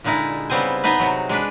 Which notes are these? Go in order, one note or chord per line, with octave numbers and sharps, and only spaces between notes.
A#2 D3 G#3 D#4 E4
C#3 G3 B3 C4 C5 G#5
B3 D#4 G#4 B4
C3 F#3
G#3 D4 B4